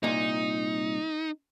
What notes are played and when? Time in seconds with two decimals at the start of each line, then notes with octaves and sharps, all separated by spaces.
0.03 C2 A#2 D#4